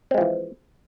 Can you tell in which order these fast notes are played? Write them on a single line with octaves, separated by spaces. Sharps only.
C4 G#3 F3 E3